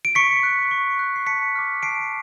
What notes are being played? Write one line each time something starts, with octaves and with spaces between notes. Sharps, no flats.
D7
C#6 B6 C#7
F#6
C#6
F#6
C7
A5 B6 C#7
D6 F6
A5 C7 D7